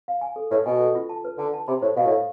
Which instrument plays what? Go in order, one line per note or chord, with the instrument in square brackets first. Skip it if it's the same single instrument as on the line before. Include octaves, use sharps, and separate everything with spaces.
[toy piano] F5
G#5
A4
[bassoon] A2 [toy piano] B4
[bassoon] B2 [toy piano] G#5
[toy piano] A4
F4
A5
B4
[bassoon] D3 [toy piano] A5
[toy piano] A5
[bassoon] C3 [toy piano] B5
[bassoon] A2 [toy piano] C5
[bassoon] B2 [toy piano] F5
[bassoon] A2
[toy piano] F5